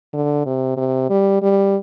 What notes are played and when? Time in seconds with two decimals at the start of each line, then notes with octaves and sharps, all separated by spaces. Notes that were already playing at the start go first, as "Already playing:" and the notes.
0.13 D3
0.46 C3
0.77 C3
1.10 G3
1.42 G3